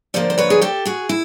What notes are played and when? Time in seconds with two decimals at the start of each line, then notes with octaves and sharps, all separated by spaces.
0.14 D3 F3 A#3 C5 D5
0.30 C5
0.38 B4 C#5
0.50 G#4
0.62 G4 A4
0.85 F#4 G#4
1.09 E4